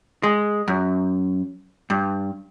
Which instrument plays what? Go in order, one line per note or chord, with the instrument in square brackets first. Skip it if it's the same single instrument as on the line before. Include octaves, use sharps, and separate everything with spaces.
[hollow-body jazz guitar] G#3
F#2
G2